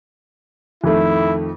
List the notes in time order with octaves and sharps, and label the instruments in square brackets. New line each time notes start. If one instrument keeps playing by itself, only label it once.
[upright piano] F2 D#3 A3 [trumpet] E4